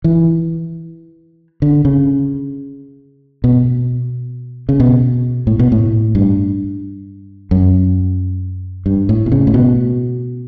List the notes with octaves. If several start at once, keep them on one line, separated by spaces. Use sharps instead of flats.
E3
D3
C#3
B2
C#3
B2
A2
B2
A2
G2
F#2
G2
A2
B2
C#3
A2
B2